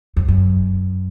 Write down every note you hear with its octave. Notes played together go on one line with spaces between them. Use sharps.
F2
F#2